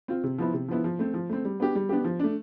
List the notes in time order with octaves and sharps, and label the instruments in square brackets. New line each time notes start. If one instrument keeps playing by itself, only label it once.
[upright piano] C4 F4
C3
F3 B3 E4
C3
F3 B3 E4
F3
A3 C4
F3
A3 C4
G3
B3 D4 G4
G3
B3 D4 G4
F3
A3 D4